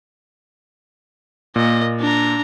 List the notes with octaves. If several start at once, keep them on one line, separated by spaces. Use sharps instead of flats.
A#2 A#3 D#5
D4 A#5